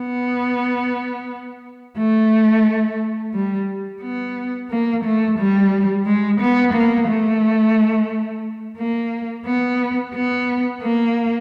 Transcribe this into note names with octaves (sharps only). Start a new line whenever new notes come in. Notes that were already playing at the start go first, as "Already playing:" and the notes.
Already playing: B3
A3
G3
B3
A#3
A3
G3
G#3
B3
A#3
A3
A#3
B3
B3
A#3